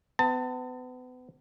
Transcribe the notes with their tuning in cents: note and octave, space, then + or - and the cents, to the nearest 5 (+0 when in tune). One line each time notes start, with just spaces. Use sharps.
B3 +35 A5 +30